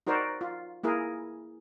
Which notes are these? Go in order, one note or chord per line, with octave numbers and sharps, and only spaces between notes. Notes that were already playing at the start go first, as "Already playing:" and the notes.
D#4 F#4 A#4 C5 D5
F4
A#3 E4 G#4 A#4